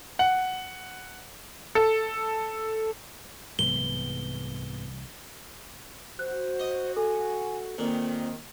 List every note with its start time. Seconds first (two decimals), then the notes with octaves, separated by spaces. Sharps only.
0.19 F#5
1.75 A4
3.59 C2 G#2 E3 F#3 B3 G7
6.19 F#4 C5 F#6
6.60 D#5
6.97 A4 G#5
7.78 A#2 D#3 C4